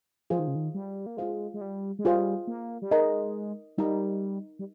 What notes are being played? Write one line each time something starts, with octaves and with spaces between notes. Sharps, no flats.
F3 F4 G#4 C5 F5
D#3
C#3
D#3
G3
A#3
G#3 F4 G#4 C5 F5
G#3
G3
G#3
G3 F4 G#4 C5 F5
A#3
G3
G#3 D#4 A#4 D#5 A#5
G3 D#4 A#4 D#5 A#5
G3